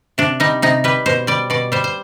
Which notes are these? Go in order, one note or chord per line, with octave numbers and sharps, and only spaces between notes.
C3 D4
G3 D#4
C3 D#4
G3 B4
B2 C5
G3 D5
B2 D5
G3 C5
C5